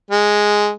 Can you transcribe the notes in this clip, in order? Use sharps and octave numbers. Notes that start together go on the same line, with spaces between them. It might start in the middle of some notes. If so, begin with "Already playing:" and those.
G#3